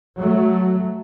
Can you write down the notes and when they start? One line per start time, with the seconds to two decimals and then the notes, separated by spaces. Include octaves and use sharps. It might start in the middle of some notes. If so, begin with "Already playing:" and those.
0.17 F#3 A3